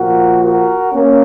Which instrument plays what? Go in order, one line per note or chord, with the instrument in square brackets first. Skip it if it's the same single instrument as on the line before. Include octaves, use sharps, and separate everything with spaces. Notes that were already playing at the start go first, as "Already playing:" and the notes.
Already playing: [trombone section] A#2 F3 F#4 A#4
F#4 A#4
A#3 C#4